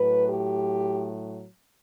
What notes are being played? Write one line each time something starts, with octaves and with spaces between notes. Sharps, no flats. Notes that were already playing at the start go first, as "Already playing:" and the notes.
Already playing: A2 F#3 B4
G4